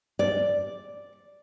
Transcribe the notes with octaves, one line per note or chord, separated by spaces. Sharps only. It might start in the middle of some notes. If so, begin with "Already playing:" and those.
D5